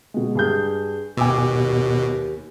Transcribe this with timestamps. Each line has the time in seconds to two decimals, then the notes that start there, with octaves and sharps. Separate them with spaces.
0.14 B2 G#3
0.35 G2 G#4 G6
1.17 D#2 B2 G#5 D6 E6